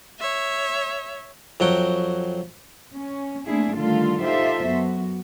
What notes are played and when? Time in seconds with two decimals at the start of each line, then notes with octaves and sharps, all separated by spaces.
0.20 C#5 E5
1.60 F2 F#3 F#4 G5
2.93 C#4
3.46 A3 A#3 C4 D4 E4 G#4
3.76 D3 D#3 G3 A3 F4 A4
4.22 D#4 F4 G4 A4 C5 E5
4.66 F#2 B3 F#4